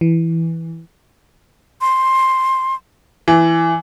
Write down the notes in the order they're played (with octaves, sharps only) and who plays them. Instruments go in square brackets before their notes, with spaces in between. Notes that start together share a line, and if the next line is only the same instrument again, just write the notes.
[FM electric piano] E3
[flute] C6
[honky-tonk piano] E3